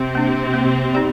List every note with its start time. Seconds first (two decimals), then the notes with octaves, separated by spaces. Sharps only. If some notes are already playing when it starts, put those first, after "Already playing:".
Already playing: C3 C4
0.15 A#3 D4
0.54 A#3
0.93 D#4 G4 D5